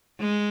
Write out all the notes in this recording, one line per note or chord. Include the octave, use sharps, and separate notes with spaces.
G#3